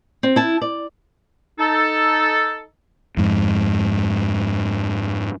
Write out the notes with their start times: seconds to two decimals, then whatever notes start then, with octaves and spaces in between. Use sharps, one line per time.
0.23 C4
0.36 E4 A5
0.62 D5
1.59 D#4 A4
3.17 F2 G#2